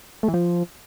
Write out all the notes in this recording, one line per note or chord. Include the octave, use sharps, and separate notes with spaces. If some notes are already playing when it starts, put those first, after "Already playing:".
A3
E3
F3